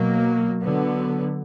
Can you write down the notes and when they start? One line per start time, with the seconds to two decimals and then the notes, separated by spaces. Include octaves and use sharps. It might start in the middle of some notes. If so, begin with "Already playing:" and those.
Already playing: B2 F#3 A#3
0.62 D3 F#3 B3